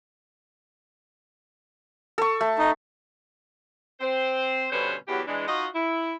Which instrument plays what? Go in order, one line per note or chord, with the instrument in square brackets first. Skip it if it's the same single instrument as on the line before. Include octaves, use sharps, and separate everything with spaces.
[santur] A4 C#6
A3
[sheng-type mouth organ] D#4
[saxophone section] C4 C5
G2 B2 D3 C#4 B4 C5
E2 E3 F#3 B3 G4
E3 G#3 D4
D#4 F4 F#4 D#5
E4